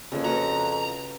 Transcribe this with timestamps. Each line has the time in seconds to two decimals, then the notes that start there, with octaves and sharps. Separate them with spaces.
0.12 F2 C#3 A#3
0.24 F#4 B4 A#5